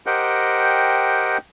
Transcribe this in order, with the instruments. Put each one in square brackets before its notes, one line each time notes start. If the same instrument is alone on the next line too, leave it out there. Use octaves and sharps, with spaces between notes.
[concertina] G4 A#4 C5 D#5 F#5 G5